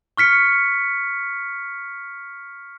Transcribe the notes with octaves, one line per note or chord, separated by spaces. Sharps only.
C#6 F6 B6 C#7